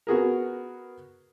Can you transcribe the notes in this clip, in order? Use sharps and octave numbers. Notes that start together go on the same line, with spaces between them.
B3 F#4 G#4 A#4